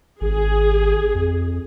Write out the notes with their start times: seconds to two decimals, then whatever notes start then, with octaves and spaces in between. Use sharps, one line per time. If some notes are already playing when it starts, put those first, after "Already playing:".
0.21 G#1 G#4
1.15 F2